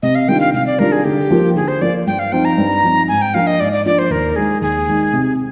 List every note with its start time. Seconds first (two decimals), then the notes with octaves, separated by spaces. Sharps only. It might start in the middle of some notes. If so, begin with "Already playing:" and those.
0.03 C3 D#5
0.15 F5
0.28 D#3 G3 D4 F4 G5
0.40 F5
0.54 C3 F5
0.67 D5
0.78 D#3 G3 D4 F4 A#4
0.92 G#4
1.04 D3 G4
1.31 F3 A#3 F4
1.56 D3 G#4
1.68 C5
1.81 F3 A#3 F4 D5
2.07 G2 G5
2.19 F5
2.32 F3 C4 D#4 G5
2.45 A#5
2.58 G2
2.83 F3 C4 D#4
3.08 G#2 G#5
3.22 G5
3.34 F3 A#3 D4 F4 F5
3.47 D#5
3.60 G#2 D5
3.72 D5
3.85 F3 A#3 D4 F4 D5
3.99 C5
4.10 D#2 A#4
4.36 D#3 G#3 D#4 G#4
4.62 D#2 G#4
4.87 D#3 G#3 D#4
5.13 C3